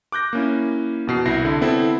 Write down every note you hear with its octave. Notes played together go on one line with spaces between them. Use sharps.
D6 F#6 G6 A#6
A#3 C#4 E4
E2 B2 C7
C2 E4 A#6 C7
D3
B3 C4 E4 A4 C5